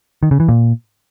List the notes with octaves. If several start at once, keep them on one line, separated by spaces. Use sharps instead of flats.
D#3
C#3
E3
A#2